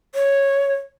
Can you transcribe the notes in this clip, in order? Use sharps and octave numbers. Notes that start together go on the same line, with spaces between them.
C#5